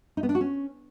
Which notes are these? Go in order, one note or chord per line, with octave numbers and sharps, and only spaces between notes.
D#4
B3
D4
F#4
C#4